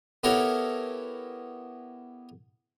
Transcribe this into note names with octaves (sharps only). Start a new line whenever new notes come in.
B3 E4 G4 A4 A#4 C#5